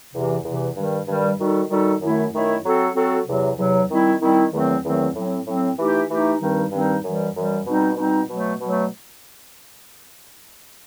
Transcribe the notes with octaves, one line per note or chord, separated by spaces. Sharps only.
E2 C3 E3
E2 C3 E3
G2 D#3 G3
G2 D#3 G3
D#3 G3 D#4 F#4 A4
D#3 G3 D#4 F#4 A4
F#2 D#3 A3 E4
F#2 D#3 A3 E4
F#3 C4 F#4 A4
F#3 C4 F#4 A4
E2 C3 F#3
E2 C3 F#3
D#3 G3 C4 E4
D#3 G3 C4 E4
E2 D#3 F#3 A3 C4
E2 D#3 F#3 A3 C4
A2 F#3 C4
A2 F#3 C4
E3 A3 D#4 G4
E3 A3 D#4 G4
G2 D#3 G3 C4 D#4
G2 D#3 G3 C4 D#4
F#2 E3 G3
F#2 E3 G3
B2 G3 C4 D#4
B2 G3 C4 D#4
B2 F#3 A3
B2 F#3 A3